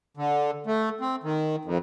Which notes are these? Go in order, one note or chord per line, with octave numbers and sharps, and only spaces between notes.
D3
A3
C4
D#3
F2